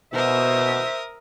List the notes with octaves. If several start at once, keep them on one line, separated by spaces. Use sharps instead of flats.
B2 A#4 C5 E5 D#6